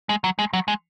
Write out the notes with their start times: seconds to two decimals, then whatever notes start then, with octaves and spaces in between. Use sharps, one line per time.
0.09 G#3
0.24 F#3
0.39 G#3
0.53 F#3
0.68 G#3